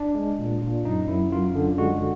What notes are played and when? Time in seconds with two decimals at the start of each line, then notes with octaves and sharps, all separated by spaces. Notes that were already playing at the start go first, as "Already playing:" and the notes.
Already playing: D4
0.15 G#3
0.39 A#2
0.61 A#2
0.85 F#2 D#4
1.08 F#2 E4
1.32 F#2 F4
1.55 D3
1.78 G#3 F#4